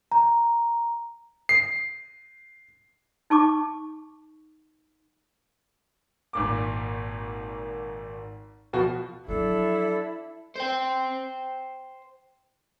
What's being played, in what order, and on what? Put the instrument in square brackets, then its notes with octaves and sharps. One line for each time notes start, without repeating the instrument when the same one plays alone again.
[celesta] A#5
[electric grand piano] C7
[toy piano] D#4 A5 C#6 D6
[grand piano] G#1 A#2 D6
B2 F3 F#4
[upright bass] F3 F#3 [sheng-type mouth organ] D4 A4 [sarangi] E4
[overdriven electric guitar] C5 G5